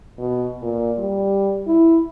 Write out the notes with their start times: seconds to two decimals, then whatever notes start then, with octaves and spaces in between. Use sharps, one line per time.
0.19 B2
0.62 A#2
0.98 G3
1.67 E4